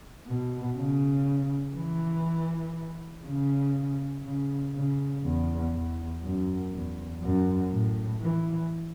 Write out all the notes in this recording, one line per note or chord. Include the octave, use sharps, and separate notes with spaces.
B2
C#3
E3
C#3
C#3
C#3
E2
E2
F#2
E2
F#2
A2
E3